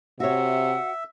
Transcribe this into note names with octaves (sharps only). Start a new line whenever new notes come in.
C3 F#4 C#5 E5 F#5